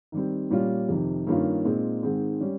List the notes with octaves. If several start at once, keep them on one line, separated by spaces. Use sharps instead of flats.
D#3 G3 C4
A#2 G3 C#4 F4
F2 C3 D#3
G2 D#3 A#3 C#4 F4
A#2 G#3 C4 D#4
G#2 D#3 G#3 C4
G3 C#4